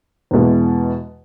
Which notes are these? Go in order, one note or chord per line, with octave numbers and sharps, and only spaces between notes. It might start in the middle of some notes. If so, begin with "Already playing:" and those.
E2 B2 G#3